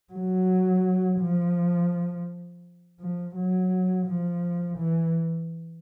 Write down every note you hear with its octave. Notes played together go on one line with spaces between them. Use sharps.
F#3
F3
F3
F#3
F3
E3